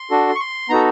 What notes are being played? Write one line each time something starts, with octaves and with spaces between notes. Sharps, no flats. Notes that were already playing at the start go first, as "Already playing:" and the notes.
Already playing: C6
D4 F#4 A4
C#6
C6
B3 D#4 F#4 A4 A#5